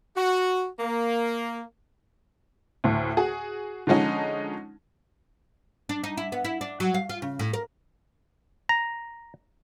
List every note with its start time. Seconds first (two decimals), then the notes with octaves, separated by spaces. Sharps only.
0.17 F#4
0.80 A#3
2.84 D2 A2
3.17 F#4 G#4
3.87 D3 F3 G#3 C#4 D#4
5.89 D4
6.04 D#4
6.17 E4
6.32 B3
6.44 E4
6.61 D4
6.80 F#3
6.94 F5
7.09 F4
7.22 C#3
7.39 A2
7.53 A#4
8.69 A#5